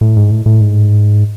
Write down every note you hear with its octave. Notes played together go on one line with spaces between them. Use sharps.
A2
G#2
A2
A2
G#2